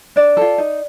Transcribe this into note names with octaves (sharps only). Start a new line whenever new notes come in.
D4 D5
F4 A4
D#4